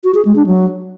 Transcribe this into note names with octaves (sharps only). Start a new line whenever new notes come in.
F#4
G#4
G#3
D4
F#3